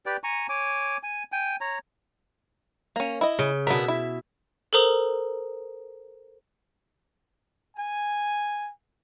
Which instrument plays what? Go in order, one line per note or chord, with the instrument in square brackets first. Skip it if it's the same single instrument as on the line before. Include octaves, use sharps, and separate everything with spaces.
[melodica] G4 B4 D5 G5
G#5 A#5 C#6
C#5 G#5 D6
G#5
G5 G#5
C#5 A#5
[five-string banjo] A#3 C#4
E4 D#5
[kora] C#3
[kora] B2 E5 [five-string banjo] B3 D4 A#4
[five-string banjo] E4
[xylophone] A4 A#4 C5 A#5 D#6
[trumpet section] G#5